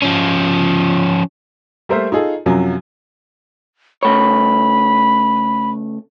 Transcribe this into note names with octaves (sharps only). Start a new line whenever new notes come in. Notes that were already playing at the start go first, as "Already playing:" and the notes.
F3 C#4
G3 A3 A#3 A#4 C5 E5
D#4 F4 G#4 A4
F#2 C3 F3 F#3
C#3 A3 C#5 B5